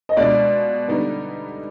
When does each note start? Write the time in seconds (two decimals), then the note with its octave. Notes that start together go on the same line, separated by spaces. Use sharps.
0.09 D#5
0.17 B2 G#3 D4 F4 D5
0.88 D3 G3 B3 D#4